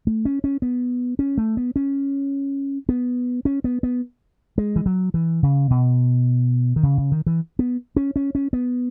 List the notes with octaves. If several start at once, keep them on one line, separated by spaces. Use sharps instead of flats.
A3
C#4
C#4
B3
C#4
A3
B3
C#4
B3
C#4
B3
B3
G#3
E3
F#3
E3
C#3
B2
D#3
C#3
C#3
D#3
E3
B3
C#4
C#4
C#4
B3